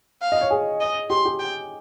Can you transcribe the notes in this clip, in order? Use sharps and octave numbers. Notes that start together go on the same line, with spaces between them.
F5
D#5
C#5
G#4
D#5
G4 C6
G4
G5